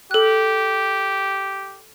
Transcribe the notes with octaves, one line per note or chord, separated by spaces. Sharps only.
G4 A4 F#6